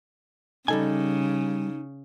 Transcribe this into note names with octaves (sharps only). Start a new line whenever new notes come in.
C#3 G3 D#4 A4 G#5